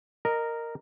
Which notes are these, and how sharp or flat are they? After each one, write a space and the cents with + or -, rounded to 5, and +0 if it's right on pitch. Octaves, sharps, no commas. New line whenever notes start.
A#4 -5 D#5 -15